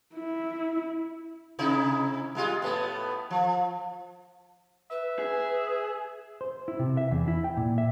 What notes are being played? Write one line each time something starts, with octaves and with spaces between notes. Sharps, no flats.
E4
C3 D#4 E4
G3 G#3 F4
A2 A3 B3
F3
B4 E5
G#4
C5
E4
C3
E5
E2
E4
G5
A#2
E5